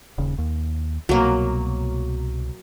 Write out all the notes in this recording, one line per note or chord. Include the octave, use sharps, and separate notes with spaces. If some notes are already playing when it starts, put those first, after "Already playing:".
D#1 C#3
D#2
C2 B2 F#3 A#3